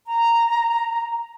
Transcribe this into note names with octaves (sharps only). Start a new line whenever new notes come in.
A#5